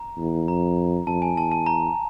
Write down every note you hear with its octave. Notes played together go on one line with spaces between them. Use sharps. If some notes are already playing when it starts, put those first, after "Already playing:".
Already playing: A#5
E2
F2 A#5
F2 A5
G#5
E2 A5
A5
A#5